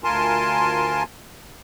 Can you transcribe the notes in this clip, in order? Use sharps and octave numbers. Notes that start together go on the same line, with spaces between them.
D2 F4 A#4 G#5 A5 C6